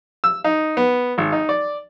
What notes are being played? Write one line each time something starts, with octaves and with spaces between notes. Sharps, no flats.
E6
D#4
B3
G#1
D#4
D5